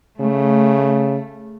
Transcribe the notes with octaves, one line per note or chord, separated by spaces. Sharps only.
C#3 A3